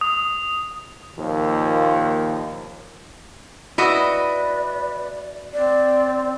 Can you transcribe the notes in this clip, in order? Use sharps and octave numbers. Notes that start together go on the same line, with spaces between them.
D#6
D#2 A#2 F3
E4 F#4 B4 D5 D#5
C4 D5